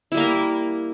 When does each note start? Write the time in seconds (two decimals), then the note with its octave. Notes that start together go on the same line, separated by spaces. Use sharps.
0.12 E4
0.14 G3
0.17 A#3
0.20 A#4